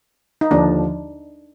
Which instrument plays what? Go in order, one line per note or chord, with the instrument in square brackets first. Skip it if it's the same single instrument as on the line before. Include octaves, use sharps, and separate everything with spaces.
[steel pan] D#4
[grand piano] D#2 D3 F3 [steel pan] D4